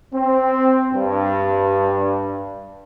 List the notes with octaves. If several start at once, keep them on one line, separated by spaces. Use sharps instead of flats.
C4
G2